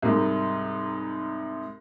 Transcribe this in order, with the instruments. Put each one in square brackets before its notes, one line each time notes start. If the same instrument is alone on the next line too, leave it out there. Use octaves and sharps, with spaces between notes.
[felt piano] C2 G#2